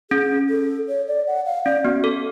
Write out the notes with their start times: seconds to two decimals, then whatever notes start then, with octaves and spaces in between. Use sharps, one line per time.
0.11 C#4 G#4
0.49 A4
0.88 C#5
1.08 D5
1.27 F#5
1.46 F5
1.65 C#4 D5
1.84 B3 F#4
2.04 A4